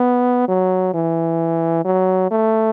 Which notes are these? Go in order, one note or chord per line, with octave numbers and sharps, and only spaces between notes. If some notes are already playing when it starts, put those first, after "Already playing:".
Already playing: B3
F#3
E3
F#3
A3